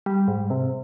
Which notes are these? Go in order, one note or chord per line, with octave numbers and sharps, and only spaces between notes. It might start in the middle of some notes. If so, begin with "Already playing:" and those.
G3
G#2
C3